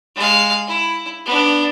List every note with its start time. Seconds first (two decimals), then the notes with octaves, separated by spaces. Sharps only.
0.16 G#3 F5
0.67 E4
1.25 B3 D4